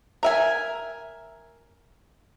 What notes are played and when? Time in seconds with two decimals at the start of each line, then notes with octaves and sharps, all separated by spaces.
0.23 A#4 E5 G#5